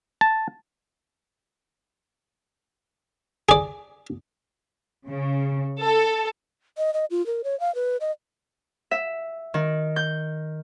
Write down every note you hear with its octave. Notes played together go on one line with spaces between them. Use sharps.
A5
G#4 D5
C#3
A4
D#5
D#5
F4
A#4
C#5
F5
B4
D#5
E5
D#3
G6